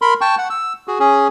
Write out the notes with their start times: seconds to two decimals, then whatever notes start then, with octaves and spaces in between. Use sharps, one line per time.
0.02 A#4 B5 C6
0.21 G5 A5 C#6
0.38 F#5
0.50 E6
0.88 F#4 G#4
1.00 C#4 G#4